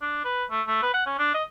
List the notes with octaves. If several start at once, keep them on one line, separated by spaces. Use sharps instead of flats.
D4
B4
A3
A3
B4
F#5
C#4
D4
D#5